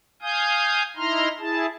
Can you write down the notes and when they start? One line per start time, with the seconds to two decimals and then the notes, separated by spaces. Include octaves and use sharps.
0.22 F5 G#5 D#6 G6
0.97 D#4 E4 A#5 C6 F6
1.39 E4 G#4 A5